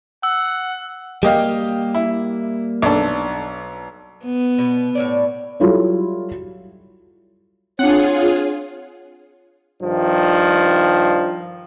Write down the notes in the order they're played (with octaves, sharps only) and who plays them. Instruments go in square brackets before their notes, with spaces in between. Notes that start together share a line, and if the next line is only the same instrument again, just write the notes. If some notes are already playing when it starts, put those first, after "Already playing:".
[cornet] F#5 [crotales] E6
[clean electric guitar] G3 A#3 [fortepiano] G4 D#5 F5
[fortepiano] E4
B1 D4 A4
[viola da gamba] B3
[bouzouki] B2
A2 C#5 D5
[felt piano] F#3 G3 E4 F4 A4 C#5
[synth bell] C4 D4 [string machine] F4 G#4 [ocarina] C#5 [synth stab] F#5
[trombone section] G2 D#3 F3